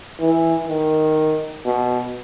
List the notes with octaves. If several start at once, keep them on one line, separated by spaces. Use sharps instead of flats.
E3
D#3
B2